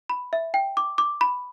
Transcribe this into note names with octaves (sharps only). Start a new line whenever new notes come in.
B5
E5
G5
D6
D6
B5